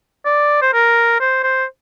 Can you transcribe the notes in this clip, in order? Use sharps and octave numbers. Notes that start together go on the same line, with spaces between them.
D5
C5
A#4
C5
C5